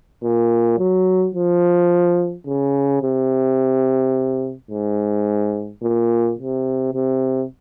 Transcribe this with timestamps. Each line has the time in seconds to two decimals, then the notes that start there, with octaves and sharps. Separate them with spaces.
0.24 A#2
0.79 F#3
1.35 F3
2.47 C#3
3.03 C3
4.71 G#2
5.83 A#2
6.39 C3
6.94 C3